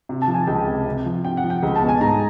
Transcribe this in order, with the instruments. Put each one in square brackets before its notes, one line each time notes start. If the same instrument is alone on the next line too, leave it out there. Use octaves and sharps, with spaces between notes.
[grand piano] C3
[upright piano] A5
[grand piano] F3
[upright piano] G#5
[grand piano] C#2 [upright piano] G5
[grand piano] C3
C3
F3
[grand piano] C3 [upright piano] G5
[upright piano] F#5
[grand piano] F3
[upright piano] G5
[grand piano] C#2
[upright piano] A5
[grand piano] B2
[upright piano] G#5
[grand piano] G#2 [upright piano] A#5